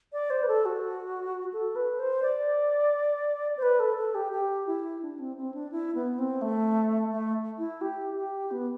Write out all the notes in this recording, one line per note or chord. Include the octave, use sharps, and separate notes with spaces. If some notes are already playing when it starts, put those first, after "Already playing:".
D5
C5
B4
A4
F#4
A4
B4
C5
D5
C5
B4
A4
A4
G4
G4
E4
D4
C4
C4
D4
E4
B3
C4
A3
A3
E4
G4
G4
B3